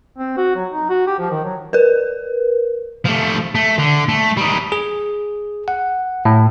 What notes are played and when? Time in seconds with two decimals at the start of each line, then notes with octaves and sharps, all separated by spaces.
0.18 C4
0.37 F#4
0.56 F#3
0.71 D#4
0.90 F#4
1.07 G4
1.19 F3
1.31 D#3
1.44 F#3
1.73 A#4 B4
3.05 F3 A3
3.55 A3
3.78 D3
4.09 A3
4.37 G3 D#4
4.72 G#4
5.68 F#5
6.25 A2